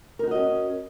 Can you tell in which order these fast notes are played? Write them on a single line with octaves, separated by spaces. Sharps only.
A#4 D#4 F#4 D#5 C#4